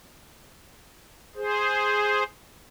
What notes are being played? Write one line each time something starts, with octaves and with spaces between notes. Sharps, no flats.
G#4 C5